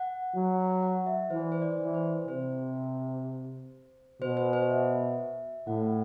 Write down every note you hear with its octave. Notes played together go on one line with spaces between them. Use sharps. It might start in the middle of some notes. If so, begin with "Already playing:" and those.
Already playing: F#5
F#3
F#5
E5
E3 C5
D5
C5
D5
C5
E3 D5
C5
C3 C5
B2 C5
C5
C5
E5
A2 F#5